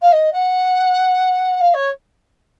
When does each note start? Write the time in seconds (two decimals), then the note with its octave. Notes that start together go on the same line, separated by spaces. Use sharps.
0.01 F5
0.12 D#5
0.32 F#5
1.60 F5
1.74 C#5